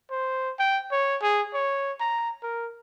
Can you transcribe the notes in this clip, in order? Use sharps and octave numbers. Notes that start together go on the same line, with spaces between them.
C5
G5
C#5
G#4
C#5
A#5
A#4